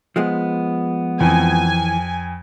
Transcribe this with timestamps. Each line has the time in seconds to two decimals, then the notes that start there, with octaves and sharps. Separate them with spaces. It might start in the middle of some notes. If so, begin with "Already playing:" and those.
0.16 F3 G#3 B3
1.20 F2 E3 G#5